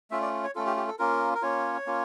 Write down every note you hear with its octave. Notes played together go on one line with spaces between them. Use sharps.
A3 C#4 F4 E5
D5
C#5
A3 C#4 F4 A4
G4
G4
A4
A#3 C#4 F4 A#4
A#4
A#3 C#4 F4 C#5
A#3 C#4 F4